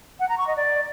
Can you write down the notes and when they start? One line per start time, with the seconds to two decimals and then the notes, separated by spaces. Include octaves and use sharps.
0.19 F#5
0.28 A#5
0.37 C#6
0.47 D#5
0.56 D5